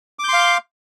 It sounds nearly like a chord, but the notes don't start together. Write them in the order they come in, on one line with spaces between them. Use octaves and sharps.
D6 G6 C6 F5